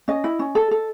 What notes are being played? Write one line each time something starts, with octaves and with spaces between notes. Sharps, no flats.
C#4 D#5
E4
C#4
A4
A4